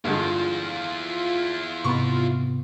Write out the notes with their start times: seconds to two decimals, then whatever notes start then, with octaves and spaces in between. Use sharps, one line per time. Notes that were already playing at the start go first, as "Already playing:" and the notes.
0.05 G2 D3 G#3 E4 F4 G#4
1.84 G#2 C3 B3 B5 C#6